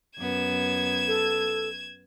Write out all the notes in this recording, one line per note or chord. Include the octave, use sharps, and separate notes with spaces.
F#2 B3 G#6 E7
A4